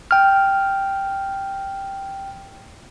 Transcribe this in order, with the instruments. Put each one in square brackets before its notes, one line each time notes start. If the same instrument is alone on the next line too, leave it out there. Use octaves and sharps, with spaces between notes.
[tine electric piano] G5 F6